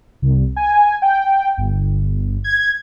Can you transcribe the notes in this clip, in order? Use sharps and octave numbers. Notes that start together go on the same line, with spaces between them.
C2
G#5
G5
G1
G#6